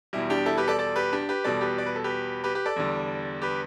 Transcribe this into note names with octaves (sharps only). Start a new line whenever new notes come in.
E2 B2 G3 E4
D4 G4
E4 A4
G4 B4
A4 D5
A4 D5
G4 B4
D4 G4
G4 B4
E2 B2 G3 A4 D5
G4 B4
D5
B4
A4
G4 B4
G4 B4
G4 B4
A4 D5
E2 D3 G3
G4 B4